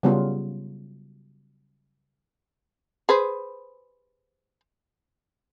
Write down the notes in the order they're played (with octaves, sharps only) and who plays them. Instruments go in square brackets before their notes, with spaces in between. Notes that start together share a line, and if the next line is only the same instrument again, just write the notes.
[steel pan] C#3 F#3 G3 B3 C#4 F4
[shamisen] G#4 B4 C5